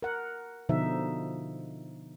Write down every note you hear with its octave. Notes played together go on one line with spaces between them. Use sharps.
A#4 F#5
B2 D3 F3 D#4 E5